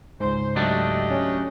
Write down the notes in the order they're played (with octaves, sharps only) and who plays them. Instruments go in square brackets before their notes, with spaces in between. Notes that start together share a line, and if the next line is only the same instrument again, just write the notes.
[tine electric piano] C#2 G#2 [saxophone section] C5
[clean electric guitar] F#3 A3 D4 [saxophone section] G4 D#5
[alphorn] C#4